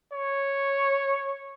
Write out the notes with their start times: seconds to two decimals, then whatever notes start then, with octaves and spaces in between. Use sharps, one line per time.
0.13 C#5